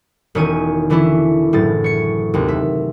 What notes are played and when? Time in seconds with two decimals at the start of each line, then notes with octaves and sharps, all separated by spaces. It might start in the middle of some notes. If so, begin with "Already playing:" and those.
0.35 E1 D#3 C#4 C#5 G#5 D#7
0.90 D3 E3 C#4 D4 E4
1.53 F#1 A2 A6
1.84 C#5 C#7
2.34 D#2 C3
2.48 E5